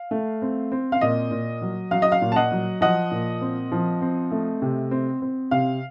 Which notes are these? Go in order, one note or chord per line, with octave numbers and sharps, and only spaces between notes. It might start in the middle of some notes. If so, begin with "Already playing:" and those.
Already playing: F5
A3
C4
C4
F5
A#2 D#5
A#2
F#3
F#3 F5
D#5
F5
A#2
A5
D#5 F#5
F#3
F3 D#5 F#5
A#2
C4
F3
C4
A3
C3
C4
C4
C3 F5